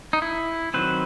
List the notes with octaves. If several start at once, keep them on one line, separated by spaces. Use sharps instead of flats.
D#4
E4
D#3 F#3 C4 B4